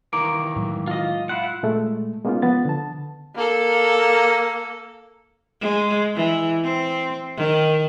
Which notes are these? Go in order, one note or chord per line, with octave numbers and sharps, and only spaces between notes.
D#3 E3 A#3 A#5 D6 D7
A2 F#3 G#3
F4 D#5
E4 F4 F#5
A#2 G#3 A3
G#3 A#3 B3 C#4 D#4 F4
F3 B3 A6
D3 A5
A#3 A4
G#3
E3
C4
D#3